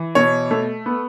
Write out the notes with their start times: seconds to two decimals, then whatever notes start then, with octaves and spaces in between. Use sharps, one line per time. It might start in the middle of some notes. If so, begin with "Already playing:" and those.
Already playing: E3
0.15 B2 C#5
0.51 A3
0.86 B3